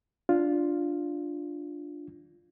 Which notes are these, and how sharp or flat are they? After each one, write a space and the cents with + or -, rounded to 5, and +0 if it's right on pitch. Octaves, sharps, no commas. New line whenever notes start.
D4 +0 F4 +0